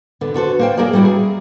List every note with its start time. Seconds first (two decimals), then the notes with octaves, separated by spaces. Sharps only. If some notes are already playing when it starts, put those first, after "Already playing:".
0.21 D3 B3
0.34 D3 F#4 A4 C5
0.59 A#3 C5 G5
0.77 A#3 G#4 A#4 C#5 D5
0.93 G3 C#4 E4 F#4
1.05 G#4